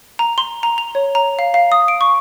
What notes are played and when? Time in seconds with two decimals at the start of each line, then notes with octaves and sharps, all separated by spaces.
0.19 A#5
0.38 C6
0.63 A#5
0.78 F7
0.95 C#5
1.15 A#5
1.39 F5
1.54 F5
1.72 D#6
1.88 D7
2.01 C#6